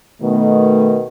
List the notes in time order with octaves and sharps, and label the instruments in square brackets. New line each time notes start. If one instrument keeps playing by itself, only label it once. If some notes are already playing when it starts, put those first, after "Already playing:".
[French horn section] B2 D#3 [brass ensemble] A3